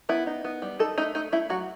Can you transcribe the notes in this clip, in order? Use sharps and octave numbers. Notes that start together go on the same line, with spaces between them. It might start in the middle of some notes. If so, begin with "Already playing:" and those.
B3 E4
D#4
B3
G3
D#4 A4
A3 D#4
A3 D#4
A3 E4
F#3 F#4